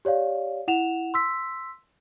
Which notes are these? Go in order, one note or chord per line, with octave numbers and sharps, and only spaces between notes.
G4 C#5 D5 F5
E4 F#5 E7 F7
C6 E6 B6